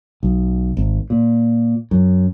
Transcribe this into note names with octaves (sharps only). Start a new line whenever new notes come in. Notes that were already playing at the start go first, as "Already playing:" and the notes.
B1
G#1
A#2
F#2